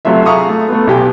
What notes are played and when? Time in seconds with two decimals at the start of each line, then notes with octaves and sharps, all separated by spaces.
0.05 C3 F#3 A3 F4 E5
0.26 G#4 F5 A#5 C#6 D#6
0.49 A3
0.69 A3 B3
0.87 B1 G4 G#5